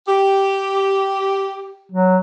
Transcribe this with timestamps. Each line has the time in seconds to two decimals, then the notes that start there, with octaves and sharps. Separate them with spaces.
0.08 G4
1.92 F#3